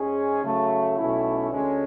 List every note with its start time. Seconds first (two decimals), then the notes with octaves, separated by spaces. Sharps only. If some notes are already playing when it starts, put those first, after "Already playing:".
Already playing: G#2 G#3 C#4 G#4
0.44 C#3 F#3 A3
0.97 B1 B2 A3 C#4 E4
1.51 D2 D3 G#3 C#4